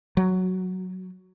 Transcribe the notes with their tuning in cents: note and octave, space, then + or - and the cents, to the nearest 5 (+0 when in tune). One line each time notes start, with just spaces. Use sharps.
F#3 +0